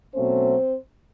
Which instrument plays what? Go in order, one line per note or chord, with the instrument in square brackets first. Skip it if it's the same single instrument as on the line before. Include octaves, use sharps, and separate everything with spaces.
[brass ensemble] B2 F#3 A3 C4 C#4 C5